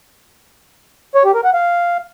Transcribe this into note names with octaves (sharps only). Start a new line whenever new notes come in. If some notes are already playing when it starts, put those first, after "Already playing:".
C#5
G4
A#4
F#5
F5